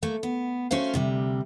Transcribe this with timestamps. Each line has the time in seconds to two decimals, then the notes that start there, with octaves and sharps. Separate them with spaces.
0.02 A3 A#3
0.23 B3
0.71 A3 C#4 F#4 C5 F5
0.94 D2 C3 G3